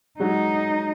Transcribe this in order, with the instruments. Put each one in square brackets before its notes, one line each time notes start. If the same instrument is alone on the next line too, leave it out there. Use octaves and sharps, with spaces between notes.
[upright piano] F#3 G#3 [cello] D#4